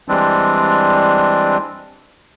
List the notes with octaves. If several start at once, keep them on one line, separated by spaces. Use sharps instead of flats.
E3 G3 G#3 C4 D4